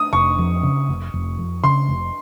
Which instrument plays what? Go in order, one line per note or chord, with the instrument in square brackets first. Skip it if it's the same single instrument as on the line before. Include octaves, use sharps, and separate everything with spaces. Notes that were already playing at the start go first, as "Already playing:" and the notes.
Already playing: [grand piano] D#6
[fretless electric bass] F1 [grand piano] C#6
[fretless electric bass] F2
C#3
F1
F1
F2
[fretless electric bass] C#3 [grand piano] C6
[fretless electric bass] F1